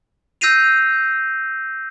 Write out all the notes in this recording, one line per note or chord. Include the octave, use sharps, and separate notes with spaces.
E6 G6 A#6 C7 D#7 F7